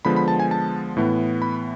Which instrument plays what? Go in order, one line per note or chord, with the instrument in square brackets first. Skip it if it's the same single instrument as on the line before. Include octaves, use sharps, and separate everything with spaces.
[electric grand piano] D3 F3 G#3 B3 B5
B5
A5
G#5
A5
A2 E3 B3
B5